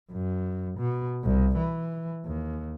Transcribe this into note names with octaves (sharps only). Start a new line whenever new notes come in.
F#2
B2
C2
E3
D#2